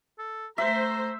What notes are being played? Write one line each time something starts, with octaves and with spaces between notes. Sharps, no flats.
A4
A3 C5 E5 A#5